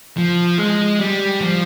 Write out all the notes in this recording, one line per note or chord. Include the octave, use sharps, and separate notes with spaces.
F3
G#3
G3
F3